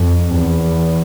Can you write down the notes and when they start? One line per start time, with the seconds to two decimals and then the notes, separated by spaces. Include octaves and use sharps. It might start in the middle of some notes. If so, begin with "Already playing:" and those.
Already playing: F2
0.35 E2